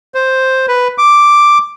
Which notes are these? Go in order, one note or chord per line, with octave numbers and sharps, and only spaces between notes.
C5
B4
D6